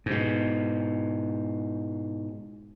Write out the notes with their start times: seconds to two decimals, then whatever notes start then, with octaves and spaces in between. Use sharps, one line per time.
0.06 G#2 B2